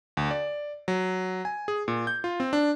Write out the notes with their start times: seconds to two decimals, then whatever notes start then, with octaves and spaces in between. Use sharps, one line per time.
0.17 D2
0.31 D5
0.88 F#3
1.45 G#5
1.68 G#4
1.88 A#2
2.07 G6
2.24 F4
2.40 C4
2.53 D4